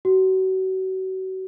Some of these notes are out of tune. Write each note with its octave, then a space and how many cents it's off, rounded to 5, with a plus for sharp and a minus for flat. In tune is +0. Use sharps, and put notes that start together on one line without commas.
F#4 +35